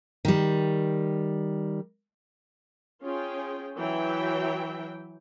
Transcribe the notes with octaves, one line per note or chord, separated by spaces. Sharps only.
D#3 G3
C#4 F4 G#4 G5
E3 F#3 E5 G5